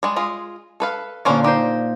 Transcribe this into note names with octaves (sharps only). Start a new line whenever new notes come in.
G3 G#3
G#3 F4 D#5
A4 B4 F5
A#2 D3 A#3 C#4 C5 C6
D#4 G4 C5